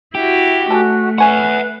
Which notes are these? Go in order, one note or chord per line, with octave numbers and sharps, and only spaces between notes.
E4 F#4 G4
A3 C#4 F#4 A4
C#4 B4 E5 F#5 G#5 C#6